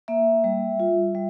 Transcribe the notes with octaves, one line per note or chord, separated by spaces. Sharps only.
A#3 E5
G3
F4
G3